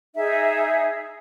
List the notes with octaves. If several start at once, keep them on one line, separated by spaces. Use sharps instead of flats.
D#4 G#4 E5